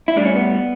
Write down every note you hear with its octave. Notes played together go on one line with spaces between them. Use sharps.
E4
A2 G3 D4
C#4
B3